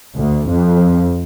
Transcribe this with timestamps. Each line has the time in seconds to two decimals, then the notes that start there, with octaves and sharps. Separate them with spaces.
0.18 D2
0.49 F2